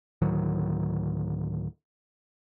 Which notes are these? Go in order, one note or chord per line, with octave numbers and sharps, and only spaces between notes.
D2 A2 D#3 F#3